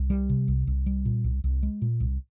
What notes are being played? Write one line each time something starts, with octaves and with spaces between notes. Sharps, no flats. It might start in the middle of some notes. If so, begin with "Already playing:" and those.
Already playing: C2
G3
C3
C2
C2
G3
A#2
C2
C2
G#3
A#2
C2